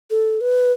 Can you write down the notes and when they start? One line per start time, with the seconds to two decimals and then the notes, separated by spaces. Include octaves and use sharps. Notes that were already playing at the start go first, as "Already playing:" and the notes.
0.10 A4
0.41 B4